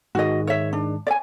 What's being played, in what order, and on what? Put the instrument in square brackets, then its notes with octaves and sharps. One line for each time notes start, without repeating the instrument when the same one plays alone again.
[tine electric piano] G#2 D#3 G#3 [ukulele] F#4 D#5
[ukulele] C#5 E5
D4
D5 G#5